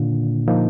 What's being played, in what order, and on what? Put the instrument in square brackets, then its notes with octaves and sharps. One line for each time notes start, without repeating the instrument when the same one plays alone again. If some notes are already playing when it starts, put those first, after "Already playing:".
Already playing: [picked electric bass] A#2 D3 [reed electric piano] D#3 A#3 D4 F4
[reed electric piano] F3 A#3 D#4